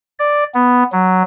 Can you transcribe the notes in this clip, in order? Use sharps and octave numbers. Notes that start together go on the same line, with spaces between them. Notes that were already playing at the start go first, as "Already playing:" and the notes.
D5
B3
F#3